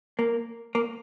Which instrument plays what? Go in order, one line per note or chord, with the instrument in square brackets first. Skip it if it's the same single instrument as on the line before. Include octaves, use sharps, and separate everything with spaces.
[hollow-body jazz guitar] A#3
A#3